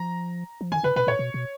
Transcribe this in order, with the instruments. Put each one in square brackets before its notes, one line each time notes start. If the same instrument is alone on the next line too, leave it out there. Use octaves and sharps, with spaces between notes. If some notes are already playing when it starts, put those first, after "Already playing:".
Already playing: [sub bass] F3 [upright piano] A#5
[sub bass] F3
[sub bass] D#3 [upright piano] G#5
[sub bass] C#3 [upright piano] B4
[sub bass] B2 [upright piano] B4
[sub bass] A#2 [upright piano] C#5
[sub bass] B2
B2